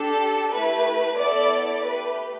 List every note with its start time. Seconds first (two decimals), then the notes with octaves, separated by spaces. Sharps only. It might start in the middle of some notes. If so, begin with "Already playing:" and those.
Already playing: D4 G4 A4
0.52 A3 E4 G4 B4
1.17 B3 E4 A4 D5
1.83 A3 G4 B4